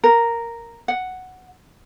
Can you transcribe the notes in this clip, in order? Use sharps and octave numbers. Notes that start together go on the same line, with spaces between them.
A#4
F#5